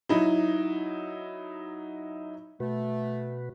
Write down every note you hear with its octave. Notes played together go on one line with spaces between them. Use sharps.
F#3 D#4 E4
B2 A3 F#4 B4